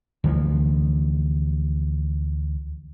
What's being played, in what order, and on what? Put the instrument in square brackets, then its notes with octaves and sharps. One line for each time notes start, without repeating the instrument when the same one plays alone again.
[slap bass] D2 E3 F3